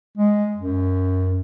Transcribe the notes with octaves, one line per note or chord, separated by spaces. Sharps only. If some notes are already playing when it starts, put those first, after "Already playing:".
G#3
F#2